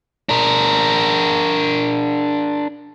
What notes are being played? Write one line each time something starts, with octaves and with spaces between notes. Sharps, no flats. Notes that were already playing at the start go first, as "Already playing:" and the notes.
D4 A#4